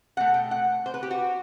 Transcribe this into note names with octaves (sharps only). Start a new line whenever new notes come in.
B2 A3 F#5
G5
F#5
C5
B4
G4
F#4